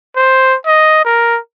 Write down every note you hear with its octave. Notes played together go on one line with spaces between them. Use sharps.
C5
D#5
A#4